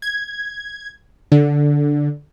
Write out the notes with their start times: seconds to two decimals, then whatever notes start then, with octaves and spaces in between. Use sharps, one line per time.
0.02 G#6
1.32 D3